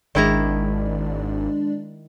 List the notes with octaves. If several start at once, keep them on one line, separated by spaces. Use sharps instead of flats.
G#1 D#3 G#3 D4 E4 D5 A#5